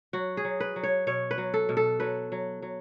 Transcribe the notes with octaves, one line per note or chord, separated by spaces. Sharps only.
F#3 F#4
G#4
F#3
B4
F#3
C#5
B2 C#5
B4
F#3
A4
B2
A4
F#3 B4
F#3
F#3